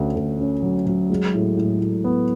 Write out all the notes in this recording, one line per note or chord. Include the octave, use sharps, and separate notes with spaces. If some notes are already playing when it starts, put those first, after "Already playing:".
Already playing: D2 C#4
D2
C#4
F#3
F#3
G#3
A2
A2
A2
B3